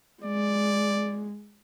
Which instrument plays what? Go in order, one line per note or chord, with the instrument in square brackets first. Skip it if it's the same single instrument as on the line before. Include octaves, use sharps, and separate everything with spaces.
[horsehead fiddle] G#3 [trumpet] D5